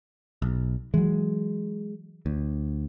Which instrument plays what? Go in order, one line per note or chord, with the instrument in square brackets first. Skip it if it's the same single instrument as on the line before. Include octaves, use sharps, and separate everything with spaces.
[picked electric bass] B1
[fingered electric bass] E3 F#3 [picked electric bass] G#3
[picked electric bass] D2